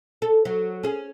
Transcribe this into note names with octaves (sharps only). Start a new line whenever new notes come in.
A4
F#3
C#4 G#4